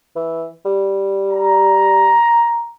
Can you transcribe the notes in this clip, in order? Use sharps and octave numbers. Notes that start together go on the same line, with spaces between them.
E3
G3
A#5